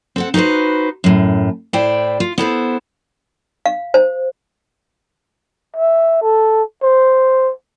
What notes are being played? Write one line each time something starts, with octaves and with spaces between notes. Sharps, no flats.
C4 A4 F#5
D#4 F#4 G#4 B4 C5
F#2 A2
A2 E4 C5 D5 G5
F4
B3 E4 A4 C5
F5
C5
E5
A4
C5